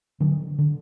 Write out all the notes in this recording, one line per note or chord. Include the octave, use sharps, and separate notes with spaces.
D3 F#3
D3